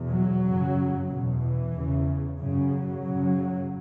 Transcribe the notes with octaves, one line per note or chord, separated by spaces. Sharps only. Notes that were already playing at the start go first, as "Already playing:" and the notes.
Already playing: E2 B2
F#3
F#2 C#3
E2 B2
E3
E2 C#3
F#2 C#3
F#3
F#2 C#3